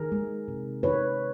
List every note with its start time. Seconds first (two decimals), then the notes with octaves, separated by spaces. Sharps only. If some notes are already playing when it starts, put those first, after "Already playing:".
Already playing: D#3 G#4 A#4
0.12 G#3
0.48 C3
0.83 D#3 B4 C#5